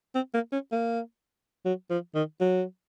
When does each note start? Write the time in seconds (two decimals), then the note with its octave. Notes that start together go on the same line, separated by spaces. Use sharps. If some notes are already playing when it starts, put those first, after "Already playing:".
0.15 C4
0.34 A#3
0.52 C#4
0.71 A#3
1.65 F#3
1.90 F3
2.15 D#3
2.40 F#3